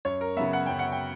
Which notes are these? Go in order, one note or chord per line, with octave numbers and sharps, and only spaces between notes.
F#2 C#5
A#4
C#3 F#3 B3 E5
F#5
F#2 G5
F#5
G5